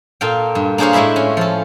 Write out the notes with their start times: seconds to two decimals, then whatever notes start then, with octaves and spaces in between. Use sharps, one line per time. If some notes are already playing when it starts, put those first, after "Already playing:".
0.21 A#2 A4 F5 G5
0.55 G2
0.78 A#3 D4 G#4 C5 C#5 F5
0.93 A2 G#3 E4 E5 B5
1.16 C#4
1.37 F3 A4